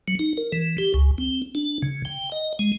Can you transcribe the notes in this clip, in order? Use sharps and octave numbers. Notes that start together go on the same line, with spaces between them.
F#3
D#4
A#4
E3
G4
C#2
C4
D4
C#3
G5
D#5
G#3